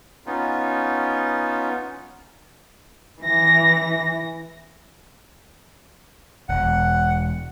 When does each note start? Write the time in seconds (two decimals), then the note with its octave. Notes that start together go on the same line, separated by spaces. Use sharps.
0.26 B3 C#4 D#4 F4
3.21 E3 A#6
6.49 E1 F#5